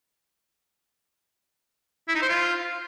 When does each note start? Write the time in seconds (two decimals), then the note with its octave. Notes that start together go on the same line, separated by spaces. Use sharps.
2.08 E4
2.15 D#4
2.22 C5
2.29 F4